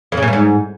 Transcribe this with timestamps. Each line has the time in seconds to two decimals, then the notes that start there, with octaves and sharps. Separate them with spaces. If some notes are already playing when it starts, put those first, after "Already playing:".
0.12 F2
0.17 C#3
0.22 A#2
0.28 G2
0.33 G#2